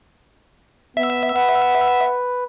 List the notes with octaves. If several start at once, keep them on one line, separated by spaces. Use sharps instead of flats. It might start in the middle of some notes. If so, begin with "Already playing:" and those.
B3 E5
B4 F#5